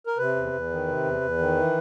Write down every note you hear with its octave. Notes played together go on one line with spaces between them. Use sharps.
A#4
C3 B4
E2
E2
D#3
C3
E2
E2
D#3
E3